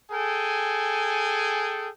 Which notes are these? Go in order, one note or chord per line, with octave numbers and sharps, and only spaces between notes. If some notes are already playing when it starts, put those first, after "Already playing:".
G#4 A4 G5 G#5